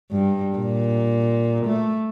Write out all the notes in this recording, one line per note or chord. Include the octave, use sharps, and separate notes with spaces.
G2
A#2
A3